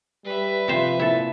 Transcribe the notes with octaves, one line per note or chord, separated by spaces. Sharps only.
G3 B4 E5
C3 F3 C5
A#2 E4 A4